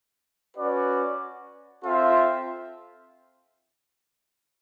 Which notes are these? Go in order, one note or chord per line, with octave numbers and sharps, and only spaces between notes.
C#4 F#4 B4 D5
C4 F4 A4 C5 E5